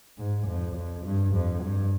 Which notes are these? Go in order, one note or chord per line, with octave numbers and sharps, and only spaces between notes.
G#2
F2
F2
G2
F2
G2